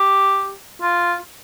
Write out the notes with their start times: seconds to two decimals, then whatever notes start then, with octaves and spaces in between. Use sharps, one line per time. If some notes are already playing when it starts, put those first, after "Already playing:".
Already playing: G4
0.82 F4